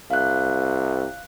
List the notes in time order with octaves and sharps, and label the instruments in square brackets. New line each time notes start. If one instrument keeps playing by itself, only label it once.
[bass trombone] C2 [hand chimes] F5 F#6